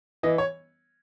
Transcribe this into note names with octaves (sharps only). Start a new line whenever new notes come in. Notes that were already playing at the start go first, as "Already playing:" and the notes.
E3 D#5
C#5